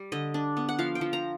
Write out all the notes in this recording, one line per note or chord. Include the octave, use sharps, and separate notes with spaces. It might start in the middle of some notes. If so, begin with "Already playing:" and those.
Already playing: G3
D3 D#5
D4
B3
F#5
F3 F5
G5
F3
A#5